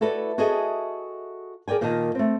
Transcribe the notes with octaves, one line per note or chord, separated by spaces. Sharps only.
E4 F#4 A4 B4 D5 E5
F#4 G#4 A4 D#5 E5 G#5
G#4 A#4 D5 G5 G#5
A#2 D#3 A#3 A#4 D#5 A5
A3 C4